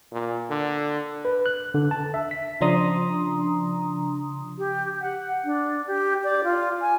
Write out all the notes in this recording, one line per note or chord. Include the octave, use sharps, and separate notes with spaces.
A#2
D3
B4
F#6
D3
A5
E5
B6
C#3 F3 D4 A#5 C6 D#6
G4
F#5
D4
G4
D5
F4
G#5